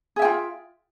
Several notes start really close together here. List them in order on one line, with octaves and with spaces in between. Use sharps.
G#4 E5 G5 F4